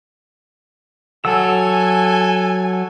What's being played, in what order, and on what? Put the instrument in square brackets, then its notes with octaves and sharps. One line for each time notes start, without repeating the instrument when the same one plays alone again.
[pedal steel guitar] F#3 F#5 E6 [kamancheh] A4 G#5